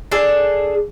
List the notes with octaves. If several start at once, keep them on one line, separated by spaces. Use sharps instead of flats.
D4 G#4 A4